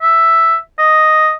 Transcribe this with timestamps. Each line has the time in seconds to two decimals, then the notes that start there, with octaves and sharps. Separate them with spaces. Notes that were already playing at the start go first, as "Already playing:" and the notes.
0.02 E5
0.79 D#5